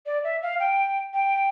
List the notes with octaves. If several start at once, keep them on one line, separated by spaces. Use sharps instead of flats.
D5
E5
F5
G5
G5